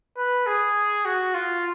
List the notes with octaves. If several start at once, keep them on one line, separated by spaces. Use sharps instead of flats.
B4
G#4
F#4
F4